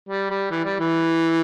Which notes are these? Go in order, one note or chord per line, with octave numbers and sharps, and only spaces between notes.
G3
G3
E3
G3
E3